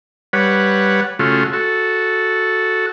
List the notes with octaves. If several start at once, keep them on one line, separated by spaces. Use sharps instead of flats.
G3 B4 C#5 F#5
C#3 A3 F4 F#4
F#4 A4